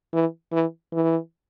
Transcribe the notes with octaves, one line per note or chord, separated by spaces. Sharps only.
E3
E3
E3